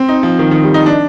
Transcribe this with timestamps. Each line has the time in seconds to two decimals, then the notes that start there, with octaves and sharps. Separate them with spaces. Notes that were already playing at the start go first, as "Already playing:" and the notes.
Already playing: C4
0.08 D#4
0.23 F3
0.39 D#3
0.51 D#3
0.63 G3
0.74 D#4
0.86 D4